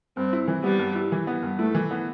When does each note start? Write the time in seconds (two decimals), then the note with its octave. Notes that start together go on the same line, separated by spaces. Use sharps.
0.17 G2 C4
0.33 E4
0.48 E3
0.64 G3 B3
0.79 G2
0.95 E4
1.12 E3
1.27 B3
1.43 G2
1.59 A3 E4
1.75 E3
1.91 B3